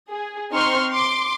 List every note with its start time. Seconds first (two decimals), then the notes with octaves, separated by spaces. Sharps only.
0.10 G#4
0.52 C4 D#4 C5 C6 C#6 F6
0.89 C6 D6